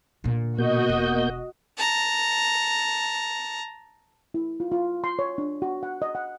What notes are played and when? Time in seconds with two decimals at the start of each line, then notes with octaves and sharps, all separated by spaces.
0.24 A#2 D3
0.58 B2 A#3 F#4 D#5 G6
0.89 E1
1.77 A5 A#5
4.34 E4
4.60 F4
4.72 F4
5.04 C6
5.19 C#5
5.38 D4
5.62 F#4
5.83 F#5
6.02 D#5
6.15 F#5